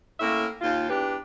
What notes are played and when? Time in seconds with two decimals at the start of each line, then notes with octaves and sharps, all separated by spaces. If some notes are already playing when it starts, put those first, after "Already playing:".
0.20 A2 A#3 C#4 E5
0.61 D#2 F4
0.90 E2 D4 G4 B4